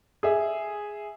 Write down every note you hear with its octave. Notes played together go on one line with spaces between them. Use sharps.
G#4 E5